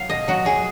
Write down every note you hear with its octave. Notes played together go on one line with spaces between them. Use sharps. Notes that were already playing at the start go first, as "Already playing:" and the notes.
Already playing: F#3 F5
B2 D#5
F#3 F#4
F#3 G#4